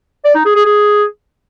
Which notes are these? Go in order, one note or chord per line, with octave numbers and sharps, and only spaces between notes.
D5
D#4
G#4
G#4
G#4